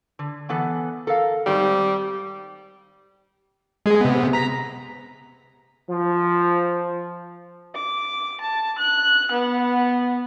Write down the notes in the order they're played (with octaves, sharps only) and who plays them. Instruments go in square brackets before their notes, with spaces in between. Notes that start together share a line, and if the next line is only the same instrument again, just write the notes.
[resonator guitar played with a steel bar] D3
E3 B3 A4
A4 A#4 F5
[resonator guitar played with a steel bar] G#2 D#3 C4 [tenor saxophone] G3
[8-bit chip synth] G#3 G#4
C3 B3
A#5 B6
[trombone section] F3
[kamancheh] D6
A5
F#6
B3